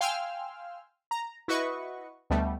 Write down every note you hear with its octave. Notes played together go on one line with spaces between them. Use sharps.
F5 G5 G#5 C6 E6 F6
A#5
E4 F#4 B4 D#5 C#6
D2 B2 G3 A3